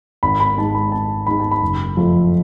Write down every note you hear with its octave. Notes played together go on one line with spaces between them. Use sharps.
G#1 B5
B5
G#2 G#3 A5
B5
G#1 A5
G#2 G#3 B5
A5
B5
F#1
F2 F3 A3